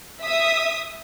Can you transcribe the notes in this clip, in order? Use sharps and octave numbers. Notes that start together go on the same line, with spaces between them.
E5 D#6